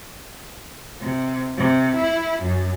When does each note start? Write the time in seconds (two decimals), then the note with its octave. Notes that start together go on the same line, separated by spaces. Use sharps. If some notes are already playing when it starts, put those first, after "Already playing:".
1.00 C3
1.57 C3
1.95 E4
2.41 F#2